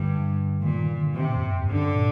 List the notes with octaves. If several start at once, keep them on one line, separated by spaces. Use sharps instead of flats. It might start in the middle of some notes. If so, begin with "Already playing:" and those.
Already playing: G2 D3
A#2 D#3
D#3
D3
D3
C3 D#3
A#2
F2
G2
F2
G2 D3
A#2